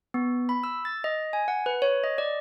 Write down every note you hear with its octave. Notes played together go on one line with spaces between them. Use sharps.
B3
B5
E6
A6
D#5
G#5
F#5
B4
C#5
D#5
D5